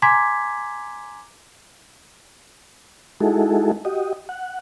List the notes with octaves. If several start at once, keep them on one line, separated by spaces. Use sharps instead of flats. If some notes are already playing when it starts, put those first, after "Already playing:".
G#5 A#5 C6 D6 G#6 B6
G#3 D#4 E4 F#4 G#4 A4
F#4 G4 D#5
F#5